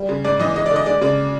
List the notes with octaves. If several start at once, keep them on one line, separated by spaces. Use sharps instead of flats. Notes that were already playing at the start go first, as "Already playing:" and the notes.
Already playing: G3
C#3
G#2 D5
E3 D#5
G#3 D#5
D5
D3 D#5
G#3 D5
C#3 D5